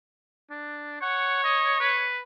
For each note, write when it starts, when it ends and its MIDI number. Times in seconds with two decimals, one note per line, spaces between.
0.50 0.98 62
1.02 2.08 73
1.02 1.44 78
1.44 1.79 75
1.80 2.22 71